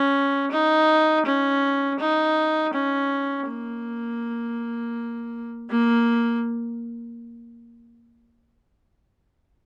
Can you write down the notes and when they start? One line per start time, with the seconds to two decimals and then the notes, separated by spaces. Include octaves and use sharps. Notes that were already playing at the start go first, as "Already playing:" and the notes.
Already playing: C#4
0.51 D#4
1.26 C#4
2.00 D#4
2.73 C#4
3.49 A#3
5.70 A#3